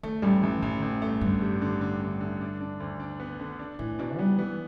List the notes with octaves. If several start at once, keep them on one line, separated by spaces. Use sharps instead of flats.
D3 A3
A1 G3
A1 E3
A1 E3
D3
A1
A2
A3
G2
G2 D3
G3
D3
D3
D3
D3
D4
D4
D2
D4
B3
D3
D4
A2 E3
B2 D4
G3 B3
E3 B3